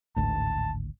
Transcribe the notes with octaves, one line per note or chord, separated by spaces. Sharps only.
G#1 D2 A2 A5